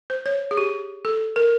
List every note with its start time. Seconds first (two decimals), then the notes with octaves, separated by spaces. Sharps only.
0.10 C5
0.26 C#5
0.51 G#4
0.57 G4
1.05 A4
1.36 A#4